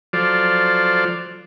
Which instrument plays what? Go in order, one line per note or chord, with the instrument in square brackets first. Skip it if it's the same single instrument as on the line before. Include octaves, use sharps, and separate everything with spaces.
[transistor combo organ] F3 F#3 F4 A4 C5 D5